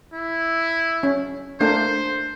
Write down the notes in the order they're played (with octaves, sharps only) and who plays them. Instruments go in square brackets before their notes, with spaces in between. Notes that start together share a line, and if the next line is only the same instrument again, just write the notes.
[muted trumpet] E4
[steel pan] C#4
[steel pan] A3 A#3 D4 [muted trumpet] C5